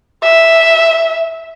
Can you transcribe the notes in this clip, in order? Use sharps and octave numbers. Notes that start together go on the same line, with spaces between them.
E5